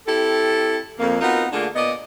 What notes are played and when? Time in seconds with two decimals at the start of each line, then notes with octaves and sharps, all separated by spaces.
0.07 C4 E4 G4 A4
0.99 F2 A#3
1.21 B3 C4 D#4 F4 F#4 A#4
1.52 D3 A3 A#3 D4 F4 G#4
1.75 A#2 B3 D5 D#5